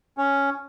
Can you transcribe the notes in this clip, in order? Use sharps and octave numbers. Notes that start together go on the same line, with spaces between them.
C#4